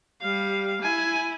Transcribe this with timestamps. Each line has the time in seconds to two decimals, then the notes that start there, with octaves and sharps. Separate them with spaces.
0.22 G3 F5
0.82 E4 G#5